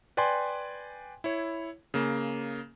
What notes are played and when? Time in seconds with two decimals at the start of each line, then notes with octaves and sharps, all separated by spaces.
0.17 B4 D5 G5 G#5 C6
1.24 E4 C#5
1.94 C#3 A#3